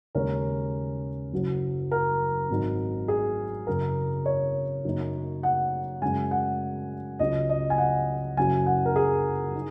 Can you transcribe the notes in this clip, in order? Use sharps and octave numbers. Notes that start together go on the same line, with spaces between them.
D#2 C#3 G#3 C#4 A#4
F#1 F#2 F#3
A#4
G#1 G#2 F#3 D#4
G#4
F#1 F#2 C#3 A#4
C#5
F#2 C#3 A#3 D#4
F#5
F#2 C#3 G#3 G#5
F#5
C#2 C#3 F#3 D#5
D#5
G#5
F#5
F#1 F#2 F#3 G#5
F#5
A#4
G#4
D#4